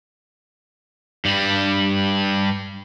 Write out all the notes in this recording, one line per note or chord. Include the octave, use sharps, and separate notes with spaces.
G2 G3